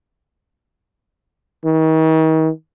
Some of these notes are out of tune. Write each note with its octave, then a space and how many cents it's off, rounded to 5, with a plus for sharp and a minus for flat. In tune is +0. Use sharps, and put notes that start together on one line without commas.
D#3 +40